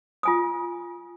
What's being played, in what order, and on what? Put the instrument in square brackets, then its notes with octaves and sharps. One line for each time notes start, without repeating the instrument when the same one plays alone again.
[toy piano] F4 G#5 D#6